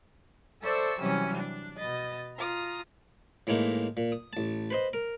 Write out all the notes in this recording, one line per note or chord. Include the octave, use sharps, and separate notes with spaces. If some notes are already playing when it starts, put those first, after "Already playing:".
A4 C5 D5 E5 C#6 E6
C3 E3 F#3 G3 C#4
D4
B2 B4 D#5 A6
F4 A#5 D#6
A2 E3 G#3 A#3 D#4
A#2
D#6
A1 A5
B4 C5 D#5
A#4